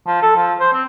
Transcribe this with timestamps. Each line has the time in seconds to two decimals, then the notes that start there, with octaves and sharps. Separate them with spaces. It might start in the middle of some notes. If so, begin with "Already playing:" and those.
0.07 F3
0.22 A4
0.36 F3
0.60 C5
0.73 C4